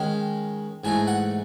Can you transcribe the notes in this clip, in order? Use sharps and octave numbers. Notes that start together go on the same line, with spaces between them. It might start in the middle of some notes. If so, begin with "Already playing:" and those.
Already playing: D#3 G#3 C#4
G#2 E3 A3 D#4 G#5
F#5